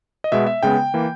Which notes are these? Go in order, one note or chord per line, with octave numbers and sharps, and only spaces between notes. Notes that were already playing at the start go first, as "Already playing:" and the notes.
D#5
B2 G#3 B3 E5
E5
C#3 G#3 B3 G5
E3 A#3